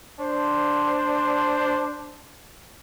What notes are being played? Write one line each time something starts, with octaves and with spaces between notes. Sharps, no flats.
D4 C5